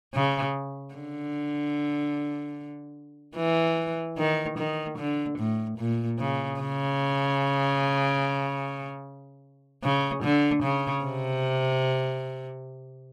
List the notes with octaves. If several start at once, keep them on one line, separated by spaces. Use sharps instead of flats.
C#3
D3
E3
D#3
D#3
D3
A2
A#2
C#3
C#3
C#3
D3
C#3
C3